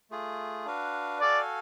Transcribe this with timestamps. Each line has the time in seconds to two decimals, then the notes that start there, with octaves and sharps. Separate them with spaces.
0.11 A3 F4 G#4
0.66 D4 F#4 B4 F5
1.22 F#4 A4 D5 F5 G#5